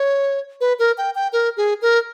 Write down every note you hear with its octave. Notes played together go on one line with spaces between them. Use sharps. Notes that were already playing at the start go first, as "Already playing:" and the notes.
Already playing: C#5
B4
A#4
G5
G5
A#4
G#4
A#4